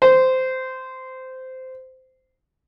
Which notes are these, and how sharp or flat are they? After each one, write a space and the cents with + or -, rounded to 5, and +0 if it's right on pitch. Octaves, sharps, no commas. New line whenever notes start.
C5 -15